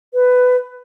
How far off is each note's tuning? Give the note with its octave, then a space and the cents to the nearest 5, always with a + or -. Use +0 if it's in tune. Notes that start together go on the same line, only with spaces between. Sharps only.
B4 +15